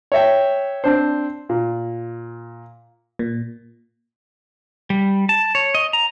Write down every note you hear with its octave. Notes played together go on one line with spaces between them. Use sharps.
C#5 E5 G5
C4 D4 C5
A#2
A#2
G3
A5
C#5
D#5
A#5